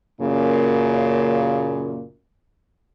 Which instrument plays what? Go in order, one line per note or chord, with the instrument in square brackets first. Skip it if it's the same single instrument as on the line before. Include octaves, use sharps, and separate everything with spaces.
[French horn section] F#2 A#2 C#3 A#3